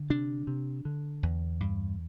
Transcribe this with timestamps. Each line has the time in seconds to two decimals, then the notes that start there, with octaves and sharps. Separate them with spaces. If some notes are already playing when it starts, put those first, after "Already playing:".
Already playing: D3
0.10 C3 D4
0.47 C3
0.85 D3
1.23 E2
1.60 G2